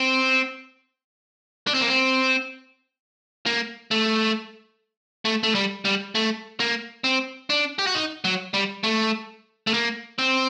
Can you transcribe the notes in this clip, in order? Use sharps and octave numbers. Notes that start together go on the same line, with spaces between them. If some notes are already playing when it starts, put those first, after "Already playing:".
Already playing: C4
D4
C4
A#3
C4
A#3
A3
A3
A3
G3
G3
A3
A#3
C4
D4
G4
F#4
D#4
F#3
G3
A3
A3
A#3
C4